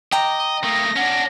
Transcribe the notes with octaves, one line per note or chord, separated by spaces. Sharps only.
D#5 G5 A#5 D6
A3 A#3 D#6 A#6
C#4 D4 F#5